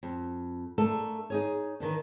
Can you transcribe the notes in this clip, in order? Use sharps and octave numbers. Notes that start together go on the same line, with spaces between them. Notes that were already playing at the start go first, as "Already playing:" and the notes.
F2
A3 A#3 D4 A4
D#4 G#4 C#5
D#3 E3 D4